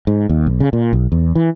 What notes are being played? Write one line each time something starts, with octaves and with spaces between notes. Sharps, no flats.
G#2
D#2
B1
C#3
A#2
B1
E2
E3